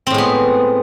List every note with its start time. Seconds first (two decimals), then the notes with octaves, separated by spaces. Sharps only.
0.07 C4
0.10 A2
0.14 G#3
0.18 B3